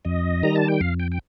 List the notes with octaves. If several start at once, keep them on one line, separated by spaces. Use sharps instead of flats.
F2 D#5
D#3 G3 A#5
A5
G5
F2 F5
G5
G5